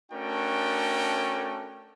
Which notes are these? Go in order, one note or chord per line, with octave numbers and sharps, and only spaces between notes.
A3 C#4 D4 F#4 A#4 G5